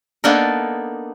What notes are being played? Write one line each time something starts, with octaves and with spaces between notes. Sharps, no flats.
A#3 B3 D4 D#4 A4 A#4